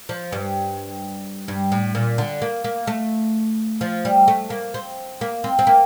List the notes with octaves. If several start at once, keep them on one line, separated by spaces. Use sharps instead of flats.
F3
G2
G2
A2
A#2
D3
A#3
A#3
A3
F3
G3
A3
A#3
C4
A#3
C4
C4
A#3